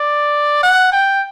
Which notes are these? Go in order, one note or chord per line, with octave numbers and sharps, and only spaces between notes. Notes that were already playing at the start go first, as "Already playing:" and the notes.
Already playing: D5
F#5
G5